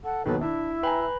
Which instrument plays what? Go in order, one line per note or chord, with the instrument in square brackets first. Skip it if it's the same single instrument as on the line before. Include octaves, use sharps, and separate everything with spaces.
[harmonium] A4 [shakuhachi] F#5
[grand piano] D#2 B2 D#3 [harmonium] F#3 B4 [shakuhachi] A4
[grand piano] D4 [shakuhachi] E4 [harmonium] E5
[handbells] B4 B5 [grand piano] G5 G#5 A#5